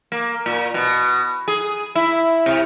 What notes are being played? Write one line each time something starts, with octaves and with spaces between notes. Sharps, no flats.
A#3
A#2
B2
G#4
E4
C3